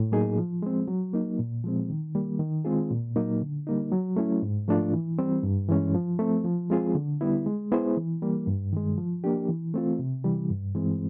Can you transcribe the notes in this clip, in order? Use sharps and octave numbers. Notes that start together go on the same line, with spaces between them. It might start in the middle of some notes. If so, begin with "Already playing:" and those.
Already playing: A2
F#3 A#3 D#4 G#4
F3
G#3 C4
F#3
A#3 D#4
A#2
F3 G#3 C4
D#3
G3 A#3
D#3
G#3 C4 F4 G#4
A#2
F#3 A#3 D#4
D3
G3 A#3 D#4
F#3
A3 C#4 E4
G#2
F3 A3 D4 F4
E3
G3 C4
G2
E3 G#3 C#4
F3
A3 C4
F3
G#3 C4 F4 G#4
D3
G3 B3 E4
G#3
B3 E4 G#4 C5
E3
G3 A#3
G2
D#3 G#3
F3
A#3 D4 G4
E3
A3 C4 F4
C3
E3 G3
G2
E3 G#3 C4